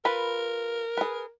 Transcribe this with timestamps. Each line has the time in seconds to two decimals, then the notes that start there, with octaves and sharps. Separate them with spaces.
0.05 F4 A#4 B4 B5
0.97 G#4 B4